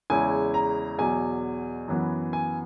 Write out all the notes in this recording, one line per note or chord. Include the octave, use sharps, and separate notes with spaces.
E2 C#3 G#3 C#4 E4 G#5
A#5
E2 B2 F#3 G#5
F#2 E3 B3
G#5